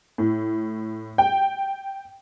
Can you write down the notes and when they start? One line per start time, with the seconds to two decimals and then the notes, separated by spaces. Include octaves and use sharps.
0.18 A2
1.18 G5